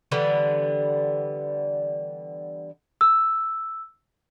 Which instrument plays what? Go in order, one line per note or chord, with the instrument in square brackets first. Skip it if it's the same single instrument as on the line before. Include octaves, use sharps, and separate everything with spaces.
[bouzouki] D3 E3 G3 B3
[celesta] E6